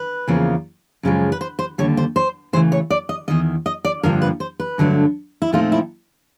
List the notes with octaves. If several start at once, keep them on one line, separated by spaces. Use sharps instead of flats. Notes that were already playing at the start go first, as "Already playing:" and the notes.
Already playing: B4
E2 C#3 F3 A#3
F#2 C#3 F3 G#3
B4
C5
C5
D#2 D3 G3 C#5
C5
C5
C#3 E3 A3 C5
C#5
D5
D#5
E2 C3 D#3 D#5
D#5
D5
G2 D3 F3 A#3 D4 A#4
B4
C5
B4
G2 D3 F#3 A3 D4
E4
A#2 F3 A3 C4 D#4 F4
E4